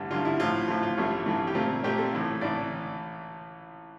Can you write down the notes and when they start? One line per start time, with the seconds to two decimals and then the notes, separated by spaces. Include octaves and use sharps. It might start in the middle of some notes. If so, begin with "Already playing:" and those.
Already playing: A1 G2 D3
0.10 A1 G2 D3 F4
0.25 E4
0.40 A1 A2 F3 F4
0.68 A1 A2 F3 F4
0.83 F4
0.97 A1 G2 E3 A3
1.26 A1 G2 E3 A3
1.47 G4
1.55 A#2 A3 C4 F4
1.83 A#2 A3 C4 G4
1.98 A4
2.13 A1 A2 E3
2.41 A1 A2 E3 D5